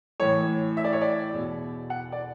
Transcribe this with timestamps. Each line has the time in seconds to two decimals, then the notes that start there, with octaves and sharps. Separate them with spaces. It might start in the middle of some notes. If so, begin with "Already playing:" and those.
0.20 A2 E3 C#5
0.77 E5
0.84 D5
0.93 C#5
1.01 D5
1.33 E2 B2
1.90 F#5
2.12 D5